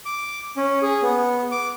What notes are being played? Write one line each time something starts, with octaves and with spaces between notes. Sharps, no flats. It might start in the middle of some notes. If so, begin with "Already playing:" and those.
D6
C#4
G#4
B3
D6